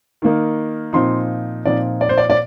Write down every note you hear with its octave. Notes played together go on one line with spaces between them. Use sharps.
D#3 A#3 D#4
A#2 F3 C4 D#4 C6
A#2 F3 C4 D#4 D5
D5
C5
D5
D5